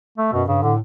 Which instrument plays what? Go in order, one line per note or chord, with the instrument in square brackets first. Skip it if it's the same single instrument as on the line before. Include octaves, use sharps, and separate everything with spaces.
[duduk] A3
[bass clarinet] F#2 [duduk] B2
[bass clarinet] G2 [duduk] C#3
[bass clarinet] A2 [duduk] D3